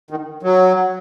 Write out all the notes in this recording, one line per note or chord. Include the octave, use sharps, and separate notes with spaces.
D#3
F#3